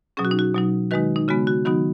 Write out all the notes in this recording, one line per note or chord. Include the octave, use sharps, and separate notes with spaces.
B2 F#3 C#4 G#4
F#4
D#4
F#4
B2 F#3 D#4
D#3 G#3 D#4 F#4 B4
D#4
C#3 G#3 B3 F#4
F#4
D#3 F#3 B3 D#4 F#4